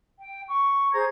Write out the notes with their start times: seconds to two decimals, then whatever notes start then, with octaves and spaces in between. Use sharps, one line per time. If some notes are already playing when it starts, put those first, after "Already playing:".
0.18 G5
0.48 C#6
0.92 G#4 C5 A#5 G#6